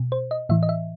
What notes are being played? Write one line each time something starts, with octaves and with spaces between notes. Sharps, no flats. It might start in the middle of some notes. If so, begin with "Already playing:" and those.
Already playing: B2
C5
D#5
A2 E3 E5
D#5
E5